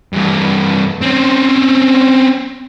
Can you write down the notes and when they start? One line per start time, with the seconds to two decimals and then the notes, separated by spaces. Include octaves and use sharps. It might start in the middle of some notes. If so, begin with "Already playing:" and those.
0.13 G2 E3
1.01 C4 C#4